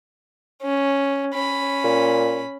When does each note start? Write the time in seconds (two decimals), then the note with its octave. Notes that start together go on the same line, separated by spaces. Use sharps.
0.63 C#4
1.34 C#4 B5
1.84 A#2